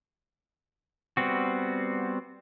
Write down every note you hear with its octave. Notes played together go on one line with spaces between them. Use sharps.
G3 B3 C4 F#4